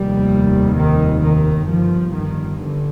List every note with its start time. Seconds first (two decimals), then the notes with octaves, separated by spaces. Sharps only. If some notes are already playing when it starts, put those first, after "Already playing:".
Already playing: F1 D#2 G3
0.76 D#3
1.23 D#3
1.69 G1 G2 F3
2.16 D#3
2.61 D3